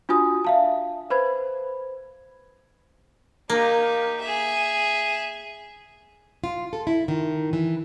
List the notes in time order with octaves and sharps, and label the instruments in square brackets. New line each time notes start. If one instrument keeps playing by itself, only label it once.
[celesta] D4 F4 F#4 G#5 D#6
E5 F5 A5
B4 C5 B5 G#6
[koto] A#3 [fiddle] D#4 G4
[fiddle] G#4 E5
[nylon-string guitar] F4
A4
E4
D#3
E3